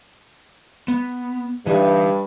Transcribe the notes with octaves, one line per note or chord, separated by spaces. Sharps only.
B3
G2 E3 D#4 E4